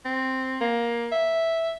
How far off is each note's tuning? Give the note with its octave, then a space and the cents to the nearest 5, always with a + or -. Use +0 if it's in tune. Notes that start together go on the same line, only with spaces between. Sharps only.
C4 +0
A#3 +15
E5 -5